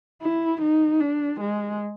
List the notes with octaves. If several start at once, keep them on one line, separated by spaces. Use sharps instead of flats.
E4
D#4
D4
G#3